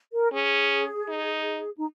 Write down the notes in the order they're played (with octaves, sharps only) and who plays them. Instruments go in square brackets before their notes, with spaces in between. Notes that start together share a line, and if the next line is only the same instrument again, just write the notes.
[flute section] A#4
[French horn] C#4 [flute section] G#4
[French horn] D#4
[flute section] D#4